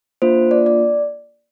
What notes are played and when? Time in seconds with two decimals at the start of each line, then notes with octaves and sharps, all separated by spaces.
0.22 A#3 D4 F4 C5
0.51 D5
0.66 D5